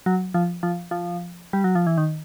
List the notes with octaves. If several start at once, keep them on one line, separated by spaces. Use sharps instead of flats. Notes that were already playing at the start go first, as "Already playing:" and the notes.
F#3
F3
F3
F3
G3
F#3
F3
E3
D#3